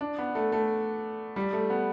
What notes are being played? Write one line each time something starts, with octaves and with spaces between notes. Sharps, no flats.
D4
B3
A3
A3
G3
A3
B3